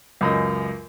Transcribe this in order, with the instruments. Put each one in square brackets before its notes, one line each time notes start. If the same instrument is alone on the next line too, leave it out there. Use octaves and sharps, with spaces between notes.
[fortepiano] C#2 F#2 D#5